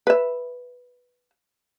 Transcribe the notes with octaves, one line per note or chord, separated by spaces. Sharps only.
B4 E5